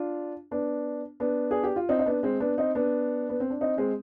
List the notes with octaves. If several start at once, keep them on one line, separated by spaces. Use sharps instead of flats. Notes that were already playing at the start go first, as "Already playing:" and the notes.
Already playing: D4 F4
B3 D4
B3 D4
G#4
G4
F4
C4 D#4
D#4
B3 D4
G#3 C4
B3 D4
C4 D#4
B3 D4
B3
C4
D4
C4 D#4
G#3 C4